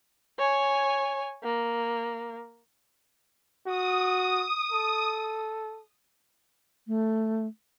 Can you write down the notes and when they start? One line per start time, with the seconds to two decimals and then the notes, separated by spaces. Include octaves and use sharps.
0.39 C#5 G#5
1.44 A#3
3.66 F#4 D#6
4.72 A4
6.87 A3